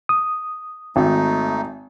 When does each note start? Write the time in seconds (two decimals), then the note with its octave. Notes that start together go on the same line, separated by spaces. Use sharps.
0.09 D#6
0.96 G#1 A3 D#4